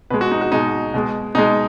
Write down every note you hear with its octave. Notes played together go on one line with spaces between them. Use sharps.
B2 G#3 B4
F#4
D#4
F#4
B2 G#3 D#4
B2 G#3
B2 G#3 D#4